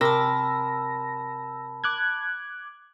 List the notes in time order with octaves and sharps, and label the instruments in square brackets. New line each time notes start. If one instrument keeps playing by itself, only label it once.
[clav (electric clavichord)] C3 [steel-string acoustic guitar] A#4 [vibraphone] A5 B5 [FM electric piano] E6 A#6
[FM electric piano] D6 F#6 G#6